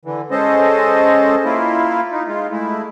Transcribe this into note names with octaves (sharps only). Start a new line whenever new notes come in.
D3 E3
G#3 C#4 A4 C5 D#5
A#3 E4 F4
D#4
G#3 F4
G#3 A3 E4